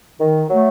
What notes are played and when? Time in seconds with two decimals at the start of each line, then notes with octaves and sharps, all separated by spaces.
0.20 D#3
0.50 F#3 A3